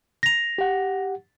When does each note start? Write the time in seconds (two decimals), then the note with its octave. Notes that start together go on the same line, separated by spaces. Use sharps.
0.23 A#6 F7
0.58 G4 F#5